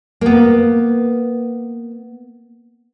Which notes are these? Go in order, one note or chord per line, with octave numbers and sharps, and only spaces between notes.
A#3 B3